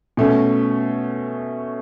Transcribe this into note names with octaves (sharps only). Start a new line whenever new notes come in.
B2 A3 C#4